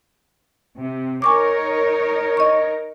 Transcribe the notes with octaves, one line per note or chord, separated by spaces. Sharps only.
C3
D#4 A#4 C#5 G#5 C#6 D6
D#5 C#6